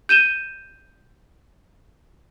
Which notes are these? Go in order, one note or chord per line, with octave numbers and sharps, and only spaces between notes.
G6 D#7 E7 G7